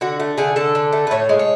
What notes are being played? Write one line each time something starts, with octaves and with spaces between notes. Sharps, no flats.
D3 F#4
A3
D3 G#4
D3 A4
D3
A3
B4
A2 C#5
G#3
C#5